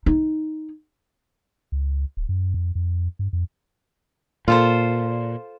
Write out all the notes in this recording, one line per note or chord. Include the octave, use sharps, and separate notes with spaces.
D#4
C#2
D1
F#2
F2
F2
G2
F2
A#2 F4 A4 C5